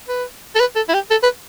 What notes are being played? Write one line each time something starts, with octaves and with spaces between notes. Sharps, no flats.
B4
A4
B4
A4
E4
G4
A4
B4